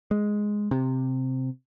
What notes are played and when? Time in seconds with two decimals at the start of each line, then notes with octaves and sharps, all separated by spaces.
0.11 G#3
0.71 C3